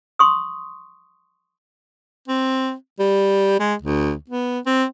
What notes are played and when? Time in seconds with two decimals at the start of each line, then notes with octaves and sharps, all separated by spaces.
0.19 C6 C#6 D#6
2.28 C4
2.99 G3
3.60 G#3
3.82 D2
4.30 B3
4.66 C4